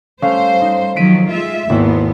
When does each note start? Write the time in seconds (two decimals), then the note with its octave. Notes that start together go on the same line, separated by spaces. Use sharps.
0.22 G3 A3 C#4 C5 F5
0.61 D#4
0.96 D#3 F3 F#3 B6 D7 D#7
1.29 G#3 F4 E5
1.70 G#1 D#2 B3 E4 C5